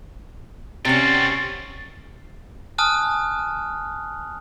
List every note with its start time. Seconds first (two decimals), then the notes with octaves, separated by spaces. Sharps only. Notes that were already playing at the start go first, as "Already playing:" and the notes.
0.85 C3 C4 C#4 F#4 A6
2.78 G#5 A5 D#6 F6 F#6